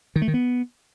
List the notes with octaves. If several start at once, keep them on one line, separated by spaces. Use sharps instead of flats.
D#3
A3
D#3
B3